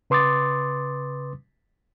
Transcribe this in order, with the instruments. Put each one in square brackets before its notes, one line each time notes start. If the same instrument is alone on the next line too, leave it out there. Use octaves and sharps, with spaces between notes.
[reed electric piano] C#3 B4 C6 D6 D#6 A6